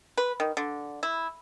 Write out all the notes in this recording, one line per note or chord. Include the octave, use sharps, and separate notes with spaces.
B4
D#3
D3
E4